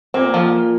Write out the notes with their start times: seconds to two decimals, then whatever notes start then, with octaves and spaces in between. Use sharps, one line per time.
0.14 A#2 A#3 C4
0.34 F3